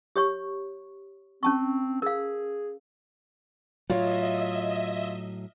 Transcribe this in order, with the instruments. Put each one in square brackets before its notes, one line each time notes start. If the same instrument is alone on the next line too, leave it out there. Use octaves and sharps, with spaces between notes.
[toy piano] G4 C#5 C#6
[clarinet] C4 [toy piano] C#4 A5 C#6
[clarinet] G#4 [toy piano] A#4 F5
[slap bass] A2 F#3 [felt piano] F4 C#5 [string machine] D#5 E5